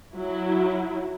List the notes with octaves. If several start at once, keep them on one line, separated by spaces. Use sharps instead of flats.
F#3 E4